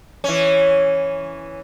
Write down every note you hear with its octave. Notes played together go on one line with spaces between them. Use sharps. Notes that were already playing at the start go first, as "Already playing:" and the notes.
E3 C#4